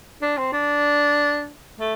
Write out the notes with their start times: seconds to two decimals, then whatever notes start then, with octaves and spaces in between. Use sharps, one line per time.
0.22 D4
0.38 C4
0.53 D4
1.80 A3